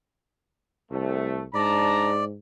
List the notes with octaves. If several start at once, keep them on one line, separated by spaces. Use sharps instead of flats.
C2 A3
G#2 D4 D5 A5 A#5